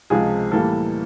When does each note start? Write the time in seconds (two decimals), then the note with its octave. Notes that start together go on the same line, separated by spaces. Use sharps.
0.10 C#2 C3 F3 G#3 G#4
0.52 A2 E3 G3 A#3 A4